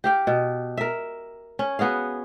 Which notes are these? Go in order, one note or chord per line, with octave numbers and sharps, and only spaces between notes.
G4 F5 G5
B2
A#4 E5
C#4
B3 F#4 G#4 F5